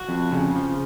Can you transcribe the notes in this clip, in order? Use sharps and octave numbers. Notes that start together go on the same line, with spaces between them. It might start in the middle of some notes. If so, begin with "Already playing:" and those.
Already playing: F#4
F2
C#3
F3